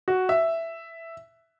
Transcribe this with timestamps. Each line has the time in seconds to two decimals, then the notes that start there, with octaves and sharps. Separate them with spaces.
0.08 F#4
0.29 E5